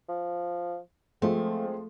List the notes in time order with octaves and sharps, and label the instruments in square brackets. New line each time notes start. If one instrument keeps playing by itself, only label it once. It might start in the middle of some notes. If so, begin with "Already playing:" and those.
[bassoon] F3
[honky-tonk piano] F3 G#3 [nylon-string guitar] A3 [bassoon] C4